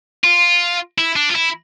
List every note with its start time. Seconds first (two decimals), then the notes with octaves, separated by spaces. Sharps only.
0.24 F4
0.98 E4
1.16 D4
1.29 F4
1.35 E4